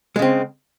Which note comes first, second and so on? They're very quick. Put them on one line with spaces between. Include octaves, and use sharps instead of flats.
G#3 C#3 C4